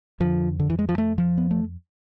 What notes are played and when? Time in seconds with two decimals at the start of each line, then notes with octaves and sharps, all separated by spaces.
0.20 F2 D3 F3
0.60 D3
0.70 E3
0.79 G#3
0.89 F3
0.98 A3
1.18 F3
1.38 B3
1.51 A3